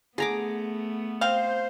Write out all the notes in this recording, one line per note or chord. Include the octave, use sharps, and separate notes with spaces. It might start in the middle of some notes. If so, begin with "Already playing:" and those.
D3 A3 B3 G#4 A#5 D6
C4 C5 F5